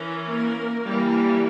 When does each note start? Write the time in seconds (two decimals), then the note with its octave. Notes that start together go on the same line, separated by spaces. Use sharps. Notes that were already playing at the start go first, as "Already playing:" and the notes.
Already playing: E3 C#4 A#4
0.29 A#3 A#4
0.83 E3 G3 A#3